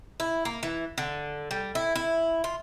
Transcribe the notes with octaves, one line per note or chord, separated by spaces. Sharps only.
E4
A#3
E3
D3
G3
E4
E4
F4